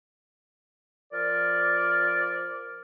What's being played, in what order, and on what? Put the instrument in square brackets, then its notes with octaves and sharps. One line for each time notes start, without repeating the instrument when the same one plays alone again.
[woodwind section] F3 A#4 D5